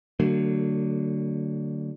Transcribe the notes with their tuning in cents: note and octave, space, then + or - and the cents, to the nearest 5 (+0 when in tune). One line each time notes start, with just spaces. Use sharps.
D3 +5 F#3 +20 A3 +35